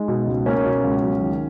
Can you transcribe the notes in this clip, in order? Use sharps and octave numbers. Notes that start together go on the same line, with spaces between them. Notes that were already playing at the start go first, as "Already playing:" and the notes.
Already playing: G#3 D#4
B2
C#2
A#3 C#4
B2
C#2
F#3
D#3